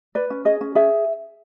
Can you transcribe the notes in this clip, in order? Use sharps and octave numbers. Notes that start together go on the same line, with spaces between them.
B4 D5
C#4
G#4 D#5
C#4
G#4 E5